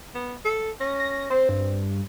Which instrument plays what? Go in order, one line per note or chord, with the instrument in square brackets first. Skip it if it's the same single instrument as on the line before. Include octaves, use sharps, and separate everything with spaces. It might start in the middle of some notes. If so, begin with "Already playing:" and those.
[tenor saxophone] B3
A4
[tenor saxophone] C#4 [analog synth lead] A#6
[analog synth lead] A#6
[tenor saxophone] C4 [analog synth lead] C5
[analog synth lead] G2